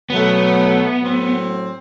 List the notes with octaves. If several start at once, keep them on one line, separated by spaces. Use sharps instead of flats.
B2 F#3 A3 B3
A2 F#3 C4